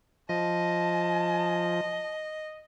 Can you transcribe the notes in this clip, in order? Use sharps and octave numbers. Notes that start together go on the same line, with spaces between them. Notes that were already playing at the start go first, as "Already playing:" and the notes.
F3 D#5 A5